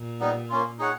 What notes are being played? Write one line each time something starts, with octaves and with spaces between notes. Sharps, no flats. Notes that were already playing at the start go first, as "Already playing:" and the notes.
Already playing: A#2
G3 B3 D#4
A#3 C#4 F4
D#4 G#4 C#5 F#5